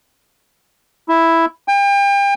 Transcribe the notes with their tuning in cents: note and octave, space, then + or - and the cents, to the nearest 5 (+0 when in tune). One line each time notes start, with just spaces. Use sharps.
E4 +0
G5 +35